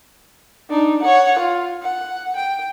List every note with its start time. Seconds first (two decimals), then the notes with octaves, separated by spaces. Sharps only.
0.69 D4 D#4
1.02 C#5 F#5
1.39 F4
1.82 F#5
2.37 G5